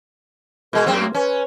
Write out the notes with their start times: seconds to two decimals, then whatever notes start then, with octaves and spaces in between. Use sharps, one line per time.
0.73 B2 G#3 A#4
0.86 F#2 A#3 C4 G#4
1.00 A3
1.15 C#4 B4